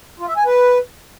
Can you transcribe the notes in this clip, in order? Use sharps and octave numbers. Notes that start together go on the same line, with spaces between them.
F4
E5
G#5
B4